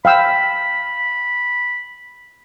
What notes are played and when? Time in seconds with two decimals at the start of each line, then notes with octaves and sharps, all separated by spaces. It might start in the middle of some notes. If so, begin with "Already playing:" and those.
0.05 F5 G5 B5 E6